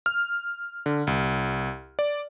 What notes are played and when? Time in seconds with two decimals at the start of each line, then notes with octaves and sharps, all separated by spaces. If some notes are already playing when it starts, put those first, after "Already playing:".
0.06 F6
0.86 D3
1.07 C2
1.99 D5